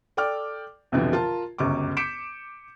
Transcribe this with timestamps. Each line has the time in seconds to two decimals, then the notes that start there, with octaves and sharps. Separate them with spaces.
0.17 A4 D5 G5 D6 F6
0.92 C2 F2 B2 D3 E3 F3
1.13 F4 A#4 A5
1.58 G1 C#2 F#2 C#6 D6
1.97 D6 G6 B6 C#7 D7 E7